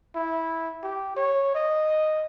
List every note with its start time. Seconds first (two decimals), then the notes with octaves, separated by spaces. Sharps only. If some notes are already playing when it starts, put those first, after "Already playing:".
0.15 E4
0.84 G4
1.16 C#5
1.54 D#5